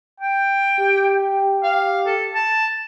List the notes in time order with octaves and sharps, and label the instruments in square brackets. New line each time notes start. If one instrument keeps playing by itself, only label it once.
[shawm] G5
[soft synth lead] G4
[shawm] F5
A4
A5